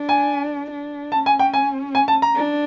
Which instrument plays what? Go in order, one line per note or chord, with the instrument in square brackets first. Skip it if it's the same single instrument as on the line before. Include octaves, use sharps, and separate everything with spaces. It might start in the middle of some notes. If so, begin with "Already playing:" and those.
Already playing: [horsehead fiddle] D4
[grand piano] G#5
[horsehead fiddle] D4
[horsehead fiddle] C#4 [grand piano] A5
[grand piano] G#5
G5
G#5
G#5
A5
A#5
[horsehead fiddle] D4